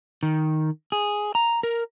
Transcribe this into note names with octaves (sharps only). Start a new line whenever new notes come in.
D#3
G#4
A#5
A#4